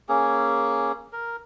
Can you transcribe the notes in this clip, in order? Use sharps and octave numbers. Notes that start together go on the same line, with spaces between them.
A#3 C#4 G#4
A#4